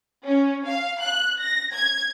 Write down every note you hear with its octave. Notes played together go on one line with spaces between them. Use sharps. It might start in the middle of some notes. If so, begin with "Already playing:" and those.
C#4
F5
F#6
A#6
G#6